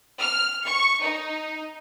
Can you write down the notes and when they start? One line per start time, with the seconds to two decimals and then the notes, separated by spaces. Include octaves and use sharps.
0.20 F6
0.66 C#6
1.01 D#4